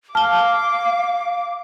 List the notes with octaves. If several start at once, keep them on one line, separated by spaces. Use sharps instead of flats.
F5 A5 D6 F6 G7